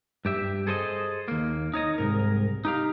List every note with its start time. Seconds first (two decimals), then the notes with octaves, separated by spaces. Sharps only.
0.25 G2 G4 E5
0.67 G#4 A4 C5 C#5 D#5
1.28 D#2 A#3
1.74 D#4 C#5 D#5
1.98 C2 G#2 A#4
2.65 D#4 G4 F5